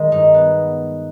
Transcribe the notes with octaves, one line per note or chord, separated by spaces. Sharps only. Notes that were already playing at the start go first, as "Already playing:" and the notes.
Already playing: D#3 G#3
G2 D#4
B3